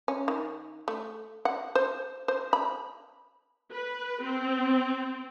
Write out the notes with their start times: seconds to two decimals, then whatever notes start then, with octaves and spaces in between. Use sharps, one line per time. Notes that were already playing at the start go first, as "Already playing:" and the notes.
0.08 C#4
0.28 D#3
0.88 A3
1.45 F#5
1.75 C5
2.28 C5
2.53 B5
3.71 B4
4.22 C4